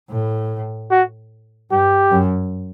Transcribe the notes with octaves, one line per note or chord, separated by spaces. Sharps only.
A2
F#4
G2 G4
F#2